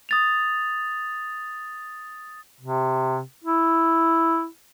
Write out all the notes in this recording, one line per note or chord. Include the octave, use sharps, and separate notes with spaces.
D#6 A6 F7
C3
E4